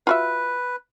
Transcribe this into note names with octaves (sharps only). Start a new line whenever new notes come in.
F4 F#4 B4 E5